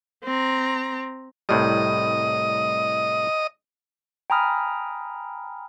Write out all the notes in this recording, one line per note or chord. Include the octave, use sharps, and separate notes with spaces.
C4 A#5
C2 A2 G3 D#5
G5 G#5 A#5 B5 D#6 F6